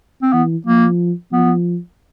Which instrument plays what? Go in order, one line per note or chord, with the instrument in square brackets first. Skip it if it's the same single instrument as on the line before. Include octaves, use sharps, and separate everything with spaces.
[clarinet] C4
[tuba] E3 [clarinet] B3
[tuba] F3 [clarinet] A#3
[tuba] F3 [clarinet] B3